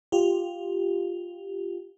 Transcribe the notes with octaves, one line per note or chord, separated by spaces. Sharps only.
F4 G4